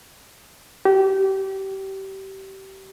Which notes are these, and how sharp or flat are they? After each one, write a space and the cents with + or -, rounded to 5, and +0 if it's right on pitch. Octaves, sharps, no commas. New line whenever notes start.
G4 -25